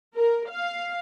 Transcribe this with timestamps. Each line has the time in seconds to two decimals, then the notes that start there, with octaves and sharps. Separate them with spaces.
0.16 A#4
0.49 F5